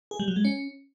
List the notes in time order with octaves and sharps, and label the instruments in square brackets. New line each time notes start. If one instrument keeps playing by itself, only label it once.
[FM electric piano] G#4
G3
F#3
G#3
C#4